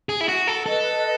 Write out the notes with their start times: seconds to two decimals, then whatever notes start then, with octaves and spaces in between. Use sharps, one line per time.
0.09 G#4
0.21 E4
0.28 F#4
0.47 A4
0.66 A4 B4 D#5